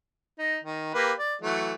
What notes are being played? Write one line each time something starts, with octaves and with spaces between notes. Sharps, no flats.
D#4
D#3
A#3 G4 B4
D5
E3 F#3 A3